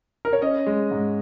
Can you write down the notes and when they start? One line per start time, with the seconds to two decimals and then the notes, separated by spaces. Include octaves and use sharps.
0.25 A#4
0.33 C#5
0.42 C#4 D#5
0.66 G#3
0.91 G#2